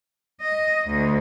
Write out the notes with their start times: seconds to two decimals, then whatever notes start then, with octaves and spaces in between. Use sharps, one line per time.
0.41 D#5
0.88 D2